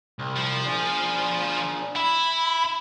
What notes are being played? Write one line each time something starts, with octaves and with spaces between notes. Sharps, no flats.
C2
F3
D4 G#4
E4 B5